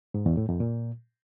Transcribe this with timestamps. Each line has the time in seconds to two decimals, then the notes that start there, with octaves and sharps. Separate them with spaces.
0.14 G#2
0.26 E2
0.37 A2
0.49 F2
0.60 A#2